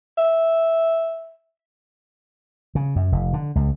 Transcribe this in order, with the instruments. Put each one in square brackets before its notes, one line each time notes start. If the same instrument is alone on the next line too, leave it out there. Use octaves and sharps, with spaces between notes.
[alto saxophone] E5
[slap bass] C#3
F#2
F1
D3
C#2